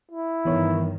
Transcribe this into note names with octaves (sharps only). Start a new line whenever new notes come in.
E4
G2 D#3 E3 B3 C#5